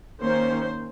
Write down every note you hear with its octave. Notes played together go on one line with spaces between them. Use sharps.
D#3 A#3 C#4 C5